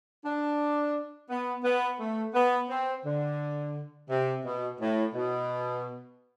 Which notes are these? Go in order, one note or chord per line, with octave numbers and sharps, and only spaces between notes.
D4
B3
B3
A3
B3
C4
D3
C3
B2
A2
B2